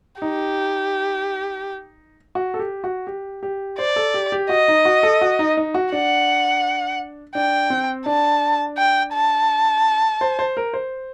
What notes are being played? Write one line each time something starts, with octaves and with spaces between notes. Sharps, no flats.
D#4 G4
F#4
A4
G4
F#4
G4
G4
C5 D5
A4
G4
G4
F#4 D#5
D#4
F#4
A4
F#4
D#4
D#4
F#4
D4 F#5
D4 G5
C4
D4 A5
G5
A5
C5
C5
A#4
C5